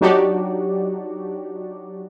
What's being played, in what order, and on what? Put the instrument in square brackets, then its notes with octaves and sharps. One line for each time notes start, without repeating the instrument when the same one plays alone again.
[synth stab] F#3 D4 D#4 F#4 G4 D5